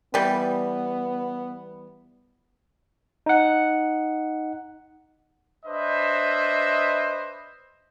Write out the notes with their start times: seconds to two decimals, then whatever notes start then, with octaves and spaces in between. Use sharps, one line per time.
0.14 E3 G3 B3
3.26 D#4 F#5
5.66 D4 B4 C5 D#5 E5